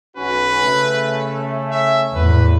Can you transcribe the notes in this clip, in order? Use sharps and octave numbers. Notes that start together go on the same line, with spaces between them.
B1 C#4 F#4 B4
C#3 A3 C#4
E5
E2 A2 B4